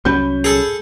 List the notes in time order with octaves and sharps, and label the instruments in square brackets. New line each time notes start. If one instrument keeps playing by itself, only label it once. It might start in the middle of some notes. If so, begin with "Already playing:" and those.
[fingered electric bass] C2 F#3 C#4 [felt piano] B5 G6
[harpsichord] G#4 A4